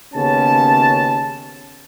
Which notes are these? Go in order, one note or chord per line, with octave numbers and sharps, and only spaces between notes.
D#2 C#3 B3 C#4 A5